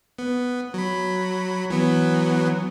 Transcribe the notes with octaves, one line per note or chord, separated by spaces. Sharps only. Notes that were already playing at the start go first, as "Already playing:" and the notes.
B3
F#3 B5
E3 F#3 B3